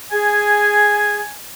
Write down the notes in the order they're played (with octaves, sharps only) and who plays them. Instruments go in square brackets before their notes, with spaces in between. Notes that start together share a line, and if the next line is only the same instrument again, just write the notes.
[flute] G#4 [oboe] G#5